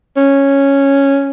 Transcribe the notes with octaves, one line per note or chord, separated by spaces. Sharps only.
C#4